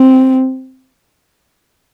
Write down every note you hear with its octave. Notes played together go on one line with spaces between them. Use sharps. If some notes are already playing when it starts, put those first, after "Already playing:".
Already playing: C4